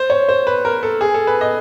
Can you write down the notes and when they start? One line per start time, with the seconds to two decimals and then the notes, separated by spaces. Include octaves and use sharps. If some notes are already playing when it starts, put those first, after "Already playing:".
Already playing: C5
0.10 C#5
0.29 C5
0.47 B4
0.65 A#4
0.83 A4
1.01 G#4
1.14 A4
1.27 B4
1.41 D#5